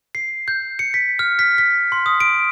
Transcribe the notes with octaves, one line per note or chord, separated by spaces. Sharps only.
C7
G6
C#7
B6
F6
B6
B6
C6
D#6
D7